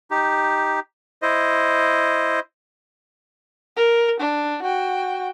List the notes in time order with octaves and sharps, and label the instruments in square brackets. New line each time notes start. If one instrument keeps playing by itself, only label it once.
[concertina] D#4 G4
E4 C5 D#5
[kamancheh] A#4
D4
F#4 G5